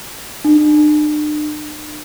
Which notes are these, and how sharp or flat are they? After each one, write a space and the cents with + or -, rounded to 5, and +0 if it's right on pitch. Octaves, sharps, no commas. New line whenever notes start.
D4 +40